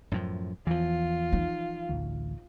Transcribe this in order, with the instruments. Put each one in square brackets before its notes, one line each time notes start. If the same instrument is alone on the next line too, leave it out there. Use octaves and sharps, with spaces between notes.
[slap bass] F#2 A2 F3
[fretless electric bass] E2 [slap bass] E3 F3 [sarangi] F4
[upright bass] D#4
[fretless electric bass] A1 D2